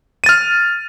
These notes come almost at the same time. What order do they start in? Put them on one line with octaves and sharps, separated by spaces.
D#7 A6 F6